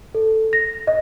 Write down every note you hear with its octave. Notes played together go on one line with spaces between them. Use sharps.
A4
A#6
D#5